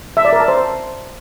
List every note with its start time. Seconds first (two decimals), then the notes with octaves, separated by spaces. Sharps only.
0.17 E5
0.25 D5
0.32 A#4
0.40 A5
0.48 C5